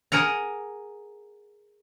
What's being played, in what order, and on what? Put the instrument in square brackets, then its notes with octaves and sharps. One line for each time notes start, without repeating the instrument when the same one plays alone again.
[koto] G#4 A#4 F#5 A#5